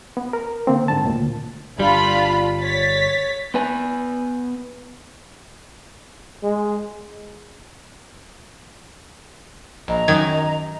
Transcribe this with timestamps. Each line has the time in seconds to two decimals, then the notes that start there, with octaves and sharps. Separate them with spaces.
0.17 B3
0.33 A#4
0.67 D3 A#3 C4
0.88 G#2 D3 A5
1.05 D2 A#2
1.78 G1 G3 D4 F4 B5
2.61 C#5 A6 B6
3.54 B3 B4 G#5
6.43 G#3
9.88 A#1 D#5 A#5
10.08 F#2 D#3 G#6